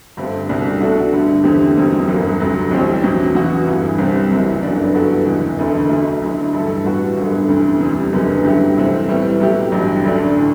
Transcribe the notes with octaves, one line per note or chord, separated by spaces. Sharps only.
G1 G2 D3 A3 C4
C2 B2 A3 D4
B2 A3 D4 F#4 A4
G2 D3 A3
E2 D3 A3 C4 G4
E1 E2 B2 G3 C4
G1 F#2 F#3
D2 C3 F#3
A1 A2 G3 C4 G4
E2 B2 F#3
E2 C3 E3 B3 F#4
G1 G2 E3
C2 C3 G3 C4
F#1 F#2 E3
G1 F#2 F#3 B3 D4
G2 E3 B3 F#4 A4
F#1 E2 C3 E3 B3
E1 D2 D3 A3
B1 B2 A3
D2 D3 F#3 A3 E4
G2 E3 A3 E4 A4
A2 G3 B3 F#4
G1 F#2 D3
D2 C3 E3
E2 C3 G3
F#1 F#2 D3 F#3 B3
G2 F#3 A3 E4 G4
C2 C3 E3 A3 C4
A2 G3 B3 E4
B2 F#3 A3 E4 G4
A1 G2 F#3
D2 D3 A3 D4
A2